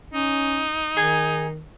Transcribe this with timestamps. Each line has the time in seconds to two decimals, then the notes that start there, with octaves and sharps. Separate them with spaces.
0.13 C#4 D#4
0.97 D#3 G#4